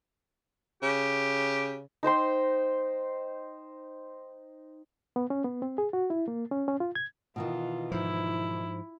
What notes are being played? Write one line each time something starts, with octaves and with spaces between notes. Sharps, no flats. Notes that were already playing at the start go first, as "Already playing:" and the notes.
C#3 G4
D#4 C5 G5 C6
B3
C#4
B3
C4
G#4
F#4
E4
A#3
C#4
C#4
F4
G#6
B2 D#3 E3 F4
G#2 F3 E4